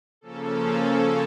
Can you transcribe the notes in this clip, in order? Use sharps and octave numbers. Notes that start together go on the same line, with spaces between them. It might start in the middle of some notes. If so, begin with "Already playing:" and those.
C#3 F3 A#3 C#4 A4